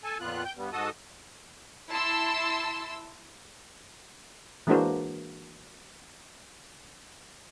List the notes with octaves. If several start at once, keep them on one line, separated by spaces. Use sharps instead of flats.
A4 G#5 A5
F2 A#2 B3 F4 F#6
G5 G6
G2 G3 B3
G#2 F#4 A4 D#5 A5 D#6
E4 A5 C6 E6
E3 G#3 A#3 D4 F#4 C5